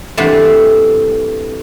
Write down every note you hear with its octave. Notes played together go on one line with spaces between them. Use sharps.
G2 C3 E3 A3 C4